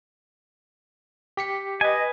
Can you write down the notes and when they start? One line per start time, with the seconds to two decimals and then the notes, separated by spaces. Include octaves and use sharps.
1.37 G4 B6 C#7
1.81 B4 D#5 G#5